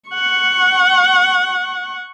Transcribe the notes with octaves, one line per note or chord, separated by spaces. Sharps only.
F#5 C#6